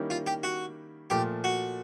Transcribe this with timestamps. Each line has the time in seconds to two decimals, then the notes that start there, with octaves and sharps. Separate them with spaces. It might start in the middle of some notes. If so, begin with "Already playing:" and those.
Already playing: D#3 G3 A#3 C#4 E4
0.10 F4
0.27 G4
0.43 F#4
1.10 A#2 F3 A3 G4
1.44 F#4